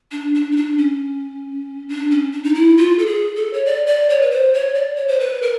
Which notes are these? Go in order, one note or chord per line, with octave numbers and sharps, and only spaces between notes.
D4
D4
D#4
D4
C#4
D4
C#4
D4
D#4
E4
F4
A4
G#4
A4
C#5
D5
D5
C#5
B4
C5
C#5
D5
C#5
C5
B4
A#4